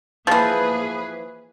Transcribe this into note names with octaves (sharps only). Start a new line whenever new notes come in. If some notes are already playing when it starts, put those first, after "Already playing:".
E3 F3 A#3 G#4 B4